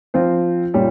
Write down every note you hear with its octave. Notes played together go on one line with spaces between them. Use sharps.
F3 C4 F4 C5
A#2 G3 C#4